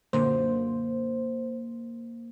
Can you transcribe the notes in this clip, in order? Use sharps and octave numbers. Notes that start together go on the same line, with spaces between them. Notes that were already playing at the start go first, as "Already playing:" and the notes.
F#2 A#2 D3 A#3 C5